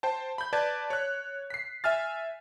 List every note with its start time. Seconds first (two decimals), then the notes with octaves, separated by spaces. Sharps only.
0.03 C5 G5 A5
0.38 B5 G6
0.53 B4 D5 A5 G#6 A6
0.90 C#5 F#6
1.50 B6 C7
1.84 E5 G#5 F6 A6